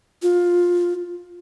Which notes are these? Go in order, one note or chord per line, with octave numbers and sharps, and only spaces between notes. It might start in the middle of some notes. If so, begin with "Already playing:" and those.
F4